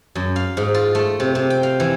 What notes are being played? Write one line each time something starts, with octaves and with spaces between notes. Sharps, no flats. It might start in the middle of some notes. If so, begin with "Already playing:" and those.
F#2
F5
G#2
F4
A3
C3
C3
G5
F5
E3